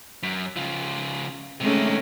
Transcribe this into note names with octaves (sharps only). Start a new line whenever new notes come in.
F#2
C#3 F3
C3 D#3 G#3 A3 C#4